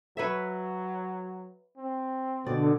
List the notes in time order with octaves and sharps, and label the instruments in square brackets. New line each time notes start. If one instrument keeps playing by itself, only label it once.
[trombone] F#3 [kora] B4 C#5 E5
[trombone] C4
[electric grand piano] B2 [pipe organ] D3 [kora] D5